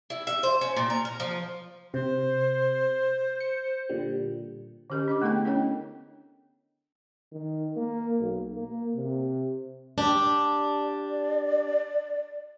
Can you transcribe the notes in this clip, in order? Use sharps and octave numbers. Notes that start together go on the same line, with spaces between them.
E4
E5
C5
C#4
A#2
A#4
A#4
F3
C3 C5
C#7
A#2 D3 G3
D3 C#4 G4 A#4 D#5
D4 D#5 D6
A3 B3 E4 G#4 A4 G5
C#4 D4 A#4 C#5 D#5 G5
D#3
A#3
B1
A#3
C3
D4 G4
D5